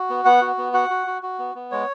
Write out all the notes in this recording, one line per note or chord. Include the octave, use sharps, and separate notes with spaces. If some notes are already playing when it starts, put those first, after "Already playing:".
Already playing: F#4
B3
B3 F#5
F#4
B3
F#4 F#5
F#4
F#4
F#4
B3
B3
G#3 C#5